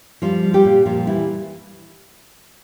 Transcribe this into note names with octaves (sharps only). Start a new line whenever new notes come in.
F3 G3 F4
G3
G3 G4
A#2
A#2 F3 F4
E3 G3 E4